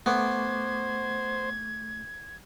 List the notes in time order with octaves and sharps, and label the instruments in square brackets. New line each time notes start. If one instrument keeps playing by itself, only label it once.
[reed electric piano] A3 C#6 D6 [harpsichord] B3 [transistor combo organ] C5 [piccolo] G#6